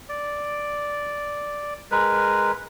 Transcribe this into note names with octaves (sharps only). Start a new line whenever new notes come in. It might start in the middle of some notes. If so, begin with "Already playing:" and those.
D5
G#3 A#4 B4